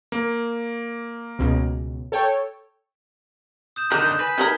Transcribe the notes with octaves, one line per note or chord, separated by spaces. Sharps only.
A#3
C#2 B2
A4 C#5 G5
D#6 G6 E7
D3 D#4 A#4 F#6 G6 E7
B4 G#5
D#4 A4 A#4 G#6 G7